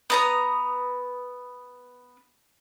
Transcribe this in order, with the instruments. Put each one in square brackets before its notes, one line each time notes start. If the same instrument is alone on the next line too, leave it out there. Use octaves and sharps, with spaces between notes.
[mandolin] B3 A#5 D#6